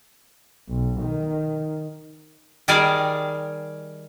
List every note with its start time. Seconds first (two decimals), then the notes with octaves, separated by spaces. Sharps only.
0.69 B1
1.01 D#3
2.68 D#3 G3 G#4 A#4 D5 G#5